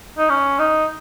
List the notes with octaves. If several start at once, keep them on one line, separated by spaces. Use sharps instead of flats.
D#4
C#4
D#4